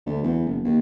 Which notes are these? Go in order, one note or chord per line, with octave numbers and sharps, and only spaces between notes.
D2
E2
F#1
D#2